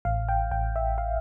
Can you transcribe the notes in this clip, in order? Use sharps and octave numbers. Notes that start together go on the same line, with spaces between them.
A1 F5
G5
A1 G5
E5
F5